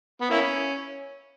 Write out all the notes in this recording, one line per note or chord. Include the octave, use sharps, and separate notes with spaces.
B3
A#3 C#4 E4